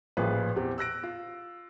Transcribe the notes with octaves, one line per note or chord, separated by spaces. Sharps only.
A1 A#2 F3 F4 G#4 B4
E2 C4 G4
E6 F#6 A#6 D7
F4